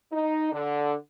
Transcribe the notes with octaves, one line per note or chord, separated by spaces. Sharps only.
D#4
D3